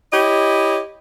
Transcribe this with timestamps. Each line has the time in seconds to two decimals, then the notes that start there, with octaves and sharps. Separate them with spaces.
0.11 E4 G4 C#5 D#5